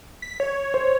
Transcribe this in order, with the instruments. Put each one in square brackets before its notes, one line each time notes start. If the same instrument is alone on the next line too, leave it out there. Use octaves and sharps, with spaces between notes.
[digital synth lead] B6
C#5
[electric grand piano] C5